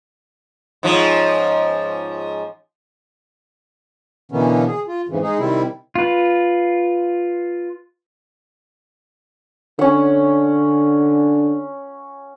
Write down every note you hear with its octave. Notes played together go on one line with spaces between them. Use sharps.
G#2 F3 C#4
B2 D3 E3 A#3 B3 C#4
G#4
F4
F2 G#2 C#3 E3
G#3 D#4 G#4
C3 D#3 G3 C4 E4
F4 B4
D3 C#4 F#5